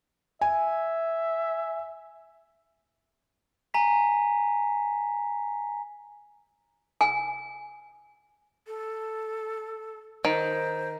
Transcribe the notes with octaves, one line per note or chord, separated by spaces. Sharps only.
E5 G#5
G#5 A#5 B6
G#5
A4
D#3 C5